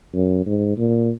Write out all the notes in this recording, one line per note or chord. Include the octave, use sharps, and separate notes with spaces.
F#2
G#2
A#2